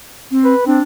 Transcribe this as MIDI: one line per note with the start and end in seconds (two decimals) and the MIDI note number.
0.31 0.53 60
0.45 0.66 71
0.66 0.79 60
0.66 0.83 62